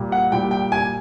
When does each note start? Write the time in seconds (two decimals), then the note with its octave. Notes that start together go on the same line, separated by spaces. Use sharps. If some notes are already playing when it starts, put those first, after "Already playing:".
Already playing: A#2 G3
0.12 F#5
0.32 A#2 G3 G5
0.51 G5
0.72 G#5